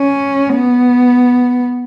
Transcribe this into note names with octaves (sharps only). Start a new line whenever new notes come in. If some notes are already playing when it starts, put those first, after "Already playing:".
Already playing: C#4
B3